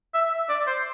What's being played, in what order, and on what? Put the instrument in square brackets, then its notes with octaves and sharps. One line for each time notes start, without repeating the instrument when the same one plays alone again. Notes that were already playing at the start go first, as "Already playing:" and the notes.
[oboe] E5
E5
D5
C5